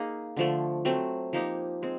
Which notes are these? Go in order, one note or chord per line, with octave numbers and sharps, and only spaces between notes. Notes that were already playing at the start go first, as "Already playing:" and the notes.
Already playing: A#3 D#4 G#4
D3 F3 A3
F#3 A3 C4
F3 A#3 D#4 G4
G#3 C4